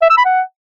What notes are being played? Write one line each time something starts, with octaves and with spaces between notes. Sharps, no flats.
E5
E6
B5
F#5